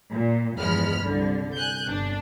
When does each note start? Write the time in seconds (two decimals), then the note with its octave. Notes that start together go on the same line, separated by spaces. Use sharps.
0.10 A#2
0.59 G1 E2 F3 G#3 B5 F6
1.05 C2 D3
1.55 G#5 F#6 G6
1.87 G1 D4